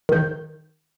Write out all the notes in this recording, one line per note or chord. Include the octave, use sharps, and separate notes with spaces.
D#3 G6